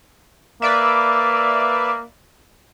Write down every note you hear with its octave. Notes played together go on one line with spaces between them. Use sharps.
A#3 B4 D5 E5